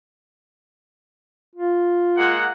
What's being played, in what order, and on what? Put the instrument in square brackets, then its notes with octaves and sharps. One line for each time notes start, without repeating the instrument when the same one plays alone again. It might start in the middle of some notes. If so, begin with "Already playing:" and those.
[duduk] F4
[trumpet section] G#3 A#3 F#5